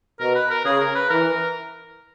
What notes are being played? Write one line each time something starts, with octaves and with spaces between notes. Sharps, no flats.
B2 A#4
B4
A#4
C#3 G#4
A#4
B4
E3 A#4